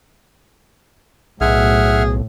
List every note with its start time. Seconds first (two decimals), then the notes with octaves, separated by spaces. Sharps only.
1.41 B1 A2 G#4 E5 F#5 F6